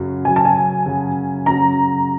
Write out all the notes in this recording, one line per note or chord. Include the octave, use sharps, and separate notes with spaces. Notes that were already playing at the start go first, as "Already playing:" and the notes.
Already playing: F#2 C#3 F#3
F#2 C#3 F#3 G#5
A5
G#5
F#2 C#3 F#3
F#2 C#3 F#3 A#5